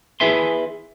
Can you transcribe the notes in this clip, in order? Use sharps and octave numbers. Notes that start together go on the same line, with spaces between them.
E4 G#4 B4 E5 G#5 C6